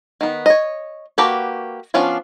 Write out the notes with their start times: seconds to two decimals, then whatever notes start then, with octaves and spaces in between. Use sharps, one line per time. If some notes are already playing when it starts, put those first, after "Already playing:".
0.21 D#3 B3
0.46 C#5 D#5
1.18 A#3 F#4 G4 B4 A5
1.94 F3 B3 C#4 D4 F4